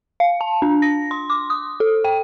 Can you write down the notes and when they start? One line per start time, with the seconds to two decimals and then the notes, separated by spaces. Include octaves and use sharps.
0.20 F5
0.41 A5
0.62 D4
0.82 A#6
1.11 C6
1.30 D6
1.50 D#6
1.80 A4
2.04 G5